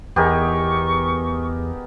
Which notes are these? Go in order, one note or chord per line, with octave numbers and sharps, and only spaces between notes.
E2 B3 D#4 G4 G#4 A#4 C#6